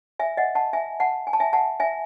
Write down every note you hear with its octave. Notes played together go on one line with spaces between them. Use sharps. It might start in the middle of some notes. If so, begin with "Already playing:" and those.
E5 G#5
D#5 F#5
F#5 A5
E5 G#5
F#5 A5
G#5
A5
E5 G#5
F#5 A5
E5 G#5